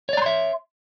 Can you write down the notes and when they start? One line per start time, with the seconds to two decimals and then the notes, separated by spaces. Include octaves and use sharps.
0.09 C#5
0.13 D5
0.17 A#5
0.22 C6
0.26 E5